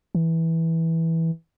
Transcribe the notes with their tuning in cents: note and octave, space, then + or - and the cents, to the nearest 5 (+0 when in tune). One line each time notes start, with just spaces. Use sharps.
E3 -10